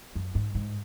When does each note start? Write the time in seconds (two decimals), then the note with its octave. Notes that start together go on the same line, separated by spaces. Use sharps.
0.15 F#2
0.35 G#2
0.55 G#2